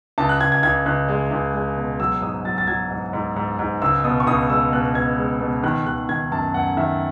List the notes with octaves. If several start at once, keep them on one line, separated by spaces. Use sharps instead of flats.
C#2 A5
F#6
C#2 G#6
G#6
C#2 G#6
C#2 F#6
G#3
C#2
G#3
B2
F#3 E6
G#2 D#6
F#3 A6
A6
F#3 G#6
G#2
G#2
G#2
G#2
C#2 E6
B2 D#6
C#6
C#2 D#6
G#3 E6
B2 F#6
B2 G#6
G#3
B2
D#3 F#6
D#3 F#6
D#3 G#6
F#2 A5
F#2 F#5
D#3 E5